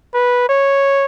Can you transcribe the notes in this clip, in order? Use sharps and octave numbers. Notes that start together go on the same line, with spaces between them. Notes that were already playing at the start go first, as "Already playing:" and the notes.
B4
C#5